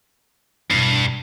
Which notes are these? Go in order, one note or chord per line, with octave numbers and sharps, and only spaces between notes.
E1 G2